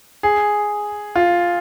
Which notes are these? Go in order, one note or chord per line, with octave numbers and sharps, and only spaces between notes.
G#4
F4